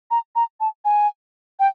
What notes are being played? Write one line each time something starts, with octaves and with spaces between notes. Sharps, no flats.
A#5
A#5
A5
G#5
G5